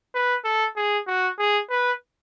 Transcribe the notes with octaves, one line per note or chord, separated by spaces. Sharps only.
B4
A4
G#4
F#4
G#4
B4